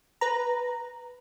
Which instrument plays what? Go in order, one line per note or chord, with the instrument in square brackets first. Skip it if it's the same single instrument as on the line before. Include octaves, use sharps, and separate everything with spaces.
[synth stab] B4 A#5